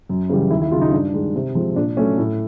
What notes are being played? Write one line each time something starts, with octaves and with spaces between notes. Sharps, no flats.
F#2
C#3 E3 G3
D#2 E4
E4
C#3 F#3 F4
D#4
G2 D4
D#3 G#3
C3
F3 G#3 C4
A#2 D4
F#3 A3 C#4
A2